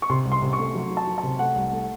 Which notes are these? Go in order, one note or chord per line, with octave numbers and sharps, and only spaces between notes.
C#6
C3 C6
C2
C6
C3
C#6
A3
F#3
F#3
A5
F#3
A5
C3
A3 F#5
C2
A3